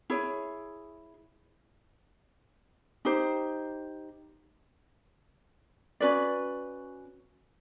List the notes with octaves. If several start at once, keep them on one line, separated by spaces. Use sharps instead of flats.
E4 G#4 C#5
D#4 G4 C5
C#4 F#4 B4 D5